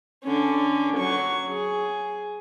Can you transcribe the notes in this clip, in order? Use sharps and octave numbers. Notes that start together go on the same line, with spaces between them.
D3 C#4
F#3 C#6
G#4